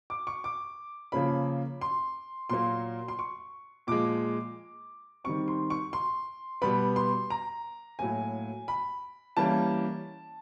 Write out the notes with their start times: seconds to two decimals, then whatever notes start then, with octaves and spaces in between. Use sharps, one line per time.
0.10 D6
0.27 C#6
0.44 D6
1.12 C#3 F3 A#3 C#4 B5
1.81 C6
2.50 A#2 F#3 A#3 C6
3.08 C6
3.19 C#6
3.87 A#2 F3 G#3 D6
5.24 D#3 G3 C4 C#6
5.48 C6
5.70 C#6
5.93 C6
6.62 B2 G3 B3 B5
6.96 C6
7.30 A#5
7.99 A2 F#3 A#3 G#5
8.68 B5
9.37 E3 G3 A#3 C#4 A5